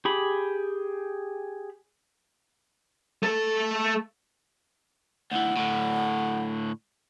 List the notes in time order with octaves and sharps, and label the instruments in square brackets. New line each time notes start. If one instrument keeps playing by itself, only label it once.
[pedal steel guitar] G4 G#4 B5
[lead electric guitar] A3 A4
[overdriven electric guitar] D2 E3 [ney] F#5
[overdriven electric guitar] A2 D3